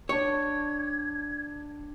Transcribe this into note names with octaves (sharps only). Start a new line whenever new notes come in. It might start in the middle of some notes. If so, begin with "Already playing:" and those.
D4 C#5 G5 G#6